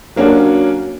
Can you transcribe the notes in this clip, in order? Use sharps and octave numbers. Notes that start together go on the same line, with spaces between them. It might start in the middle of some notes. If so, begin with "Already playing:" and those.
F#3 A#3 C#4 D4 F#4